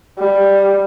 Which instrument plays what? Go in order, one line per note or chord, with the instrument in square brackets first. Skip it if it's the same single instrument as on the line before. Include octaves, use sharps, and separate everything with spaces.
[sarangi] G3